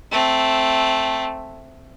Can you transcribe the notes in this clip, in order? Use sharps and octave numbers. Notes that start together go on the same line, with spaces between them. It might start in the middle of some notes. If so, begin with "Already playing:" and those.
A3 C4